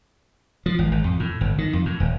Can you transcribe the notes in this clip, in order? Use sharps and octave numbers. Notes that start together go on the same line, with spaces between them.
F3
G#1
G#1
F2
A2
G1
D#3
F2
A2
D#1